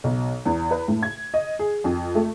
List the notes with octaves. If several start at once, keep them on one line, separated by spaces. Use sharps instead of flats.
B1
E2
B4
A2
G#6
D#5
G#4
F2
A3